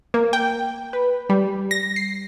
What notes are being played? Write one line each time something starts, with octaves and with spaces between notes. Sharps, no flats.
A#3
G5
B4
G3
A#6
C7